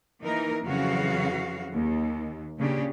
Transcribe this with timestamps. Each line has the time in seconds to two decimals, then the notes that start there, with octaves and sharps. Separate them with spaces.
0.21 E3 A#3 D#4 A#4
0.63 F2 C#3 E3 F#3 F#4 F5
1.73 D#2
2.57 A#2 C#3 C#4 D4 G4